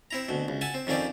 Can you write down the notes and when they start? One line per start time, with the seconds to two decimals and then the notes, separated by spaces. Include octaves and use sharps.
0.11 C4 E4 A#5
0.29 D2 B2
0.48 C#2
0.61 E5 F#5 G#5 A5
0.74 C4
0.87 F2 D#3 C4 C#4 D5